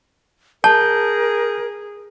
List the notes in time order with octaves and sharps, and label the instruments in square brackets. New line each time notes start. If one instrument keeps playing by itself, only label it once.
[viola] G#4 [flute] A#4 [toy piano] A5 [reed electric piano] G6